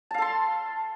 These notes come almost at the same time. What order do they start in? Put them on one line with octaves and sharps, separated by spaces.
A5 F5 A4 C6